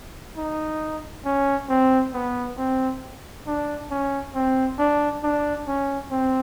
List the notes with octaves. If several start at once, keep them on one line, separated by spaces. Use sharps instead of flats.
D#4
C#4
C4
B3
C4
D4
C#4
C4
D4
D4
C#4
C4